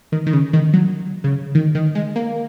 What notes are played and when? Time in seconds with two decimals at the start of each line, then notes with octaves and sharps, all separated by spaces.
0.12 D#3
0.26 D#3
0.33 C#3
0.53 D#3
0.73 F#3
1.24 C#3
1.55 D#3
1.75 D#3
1.95 G#3
2.16 A#3